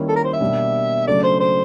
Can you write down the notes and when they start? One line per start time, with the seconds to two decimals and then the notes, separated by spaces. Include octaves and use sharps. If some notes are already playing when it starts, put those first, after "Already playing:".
Already playing: D#3 G3 A#3 C#4 E4
0.08 A4
0.16 A#4
0.24 C5
0.33 E5
0.41 B2 G3 A#3 D4
1.07 C#3 F#3 A3 D4 D5
1.24 C5
1.40 C5